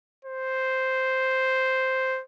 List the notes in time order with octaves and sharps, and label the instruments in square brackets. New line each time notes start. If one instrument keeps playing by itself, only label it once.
[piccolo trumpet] C5